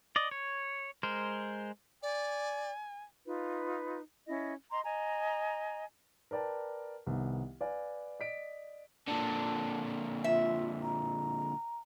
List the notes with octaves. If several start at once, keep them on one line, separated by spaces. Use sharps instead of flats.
D5 D#5
C#5
G#3 A#4 C5
D5 G#5
D#4 F4 B4
C#4 E4 D#5
D#5 A#5 C6
D#5 G#5 A#5
A#4 B4 D5 G5 A5
C2 D#3 B3
B4 D5 F5 G#5
D5 D#5 B6 D7
A#2 D3 A5
F4 E5
A#5